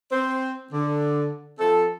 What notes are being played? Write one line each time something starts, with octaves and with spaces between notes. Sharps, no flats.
C4 C5
D3
F3 C4 A4